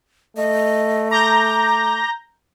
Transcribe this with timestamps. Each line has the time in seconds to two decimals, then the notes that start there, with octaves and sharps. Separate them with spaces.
0.37 A3 D#5
1.11 A#5 D6 G6 A#6